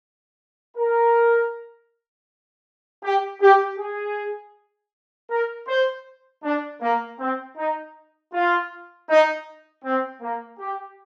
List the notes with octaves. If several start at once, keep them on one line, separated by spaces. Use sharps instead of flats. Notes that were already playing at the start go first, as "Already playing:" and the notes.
A#4
G4
G4
G#4
A#4
C5
D4
A#3
C4
D#4
F4
D#4
C4
A#3
G4